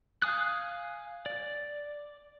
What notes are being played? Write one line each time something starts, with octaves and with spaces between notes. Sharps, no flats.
F5 G#5 D#6 F#6
D5